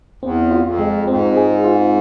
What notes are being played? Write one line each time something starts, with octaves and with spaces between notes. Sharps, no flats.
E2 C4
F4
F2
G#3
G#2 C4
G#4
F4